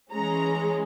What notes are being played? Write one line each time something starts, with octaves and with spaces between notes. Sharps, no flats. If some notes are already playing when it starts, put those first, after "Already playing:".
E3 G#3 C#4 A#5